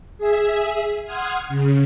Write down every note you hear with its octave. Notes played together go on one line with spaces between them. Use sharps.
G#4 E5
F#5 C6 D#6 F6 G#6
C#3